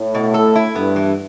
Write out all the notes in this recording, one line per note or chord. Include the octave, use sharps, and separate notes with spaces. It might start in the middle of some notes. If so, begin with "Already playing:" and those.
Already playing: A2
B2
A4
E4
G2 B3
E3